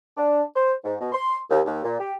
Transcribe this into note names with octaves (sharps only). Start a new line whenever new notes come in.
D4
C5
G#2
B2
C6
D#2
D#2
A#2
G4